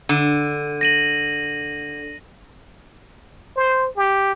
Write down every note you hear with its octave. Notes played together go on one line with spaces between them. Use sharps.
D3 D#7
A#6 D#7 F#7
C5
G4